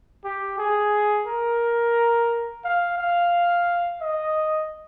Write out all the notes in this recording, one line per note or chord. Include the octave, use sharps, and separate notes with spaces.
G4
G#4
A#4
F5
F5
D#5